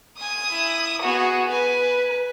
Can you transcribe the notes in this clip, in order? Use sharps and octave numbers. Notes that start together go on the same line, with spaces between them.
G#5 D#6
E4
B3 F#4 G#4
B4 G#5